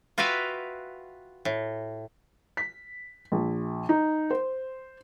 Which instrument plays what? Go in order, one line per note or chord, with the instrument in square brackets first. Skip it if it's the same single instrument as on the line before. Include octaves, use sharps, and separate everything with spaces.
[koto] F4 F#4 B4 E5 F5 G5
A2
[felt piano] B6
A#1
D#4
C5